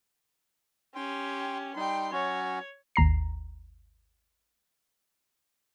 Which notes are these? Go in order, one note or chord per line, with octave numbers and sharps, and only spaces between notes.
C#4 G4 G5 C6
G3 D#4 G5 C6
F#3 C#4 F#4 C#5
G#1 D#2 A#5 C7